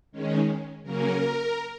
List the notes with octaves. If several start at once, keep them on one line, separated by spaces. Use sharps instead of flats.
D#3 G#3 C#4
C#3 F#3 A#3 C#4 A#4